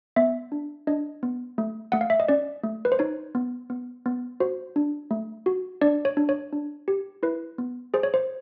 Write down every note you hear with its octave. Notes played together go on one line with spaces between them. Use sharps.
B3 E5
D4
D4 D#5
B3
A3
A3 F#5
F5
E5
D#5
C#4 D5
A3
B4
C5
D#4 C#5
B3
B3
B3
F#4 C5
D4
A3
F#4
D4 D5
C#5
D4
C#5
D4
G4
E4 B4
B3
G#4 C5
C#5
C5